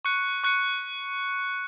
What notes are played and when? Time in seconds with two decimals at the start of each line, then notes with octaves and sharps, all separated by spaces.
0.05 C#6 F#6 C#7
0.44 C#6 F#6 C#7